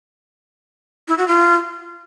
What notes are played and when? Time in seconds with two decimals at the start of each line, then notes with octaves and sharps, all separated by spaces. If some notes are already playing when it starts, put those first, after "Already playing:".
1.08 E4
1.18 F#4
1.28 F4